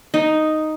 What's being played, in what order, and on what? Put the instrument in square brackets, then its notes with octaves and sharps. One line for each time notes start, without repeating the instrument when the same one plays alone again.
[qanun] D#4